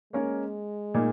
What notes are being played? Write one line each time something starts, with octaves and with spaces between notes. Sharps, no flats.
G#3 A#3 C#4 A#4 C#5
A#2 A#3 D#4